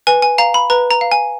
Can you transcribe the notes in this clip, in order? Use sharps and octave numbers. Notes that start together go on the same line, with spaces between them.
B4 G#5
G#5
F5 A#5
B5
B4 A#5
A#5
F5
G#5